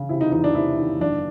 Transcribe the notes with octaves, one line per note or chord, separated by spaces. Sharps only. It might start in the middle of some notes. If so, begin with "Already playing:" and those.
Already playing: C#3
C3 E4
D#4
E2 D#4
D4
C3 E4
D#3
F#1 D4